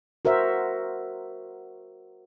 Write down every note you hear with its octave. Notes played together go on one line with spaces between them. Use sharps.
F#4 A#4 C5 E5